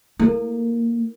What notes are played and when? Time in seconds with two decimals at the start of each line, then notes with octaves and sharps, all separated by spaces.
0.19 A#3 E4 A4 A#4